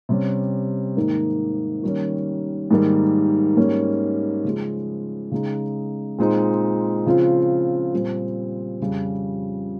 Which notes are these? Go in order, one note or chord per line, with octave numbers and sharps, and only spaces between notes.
C3 G3 C#4
G#2 D#3 A#3 D#4
D#3 G3 A#3 C#4
G#2 D#3 G3 A#3
G#2 G3 A#3 C#4
C#3 F3 G#3
C#3 G#3 D#4
A#2 G#3 C4 D#4
C#3 F3 C4 F4
A#2 G3 C4
F2 C#3 G3